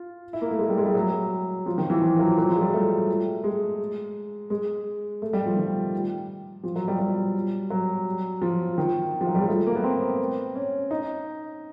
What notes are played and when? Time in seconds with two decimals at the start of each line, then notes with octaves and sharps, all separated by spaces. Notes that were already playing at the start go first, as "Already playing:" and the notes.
Already playing: F4
0.33 E4
0.41 A#3
0.51 A3
0.59 G#3
0.69 G3
0.77 G#3
0.86 G3
0.95 F#3
1.66 F3
1.78 D#3
1.90 E3
2.02 F3
2.19 F#3
2.38 F#3
2.49 F3
2.56 G#3
2.61 G3
2.73 A3
3.44 G#3
4.50 G#3
5.22 A3
5.33 G3
5.46 F3
5.57 D#3
6.64 F3
6.76 F#3
6.88 G3
6.99 G3
7.70 F#3
8.42 F3
8.78 D#3
9.21 F3
9.27 F#3
9.35 G3
9.41 G#3
9.48 A3
9.67 A#3
9.75 B3
9.83 C4
10.55 C#4
10.91 D#4